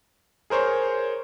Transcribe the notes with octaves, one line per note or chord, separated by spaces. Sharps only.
G#4 A#4 C5 C#5